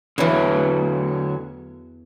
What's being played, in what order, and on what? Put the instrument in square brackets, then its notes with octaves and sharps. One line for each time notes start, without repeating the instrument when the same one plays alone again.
[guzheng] E2 E3 [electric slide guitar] D3 F#3 C#5